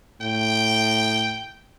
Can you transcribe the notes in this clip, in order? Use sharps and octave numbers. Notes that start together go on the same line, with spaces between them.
A2 G5